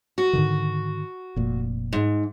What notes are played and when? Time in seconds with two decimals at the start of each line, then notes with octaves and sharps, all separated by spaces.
0.18 F#4
0.33 G#2 D3 D#3
1.36 F1 A#2
1.93 G#2